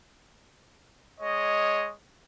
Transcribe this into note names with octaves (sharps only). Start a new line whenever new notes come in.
G#3 C#5 D#5